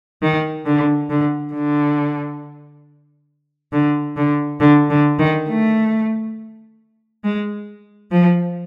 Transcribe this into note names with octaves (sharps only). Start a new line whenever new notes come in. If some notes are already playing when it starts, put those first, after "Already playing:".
D#3
D3
D3
D3
D3
D3
D3
D3
D#3
A3
G#3
F3